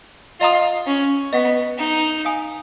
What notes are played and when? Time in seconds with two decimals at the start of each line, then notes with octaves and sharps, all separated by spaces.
0.40 F4 D#5 F#5 A#5 D#6
0.87 C#4
1.33 B3 D#5 F#5 C#6
1.79 D#4
2.25 F5 G#5 D#6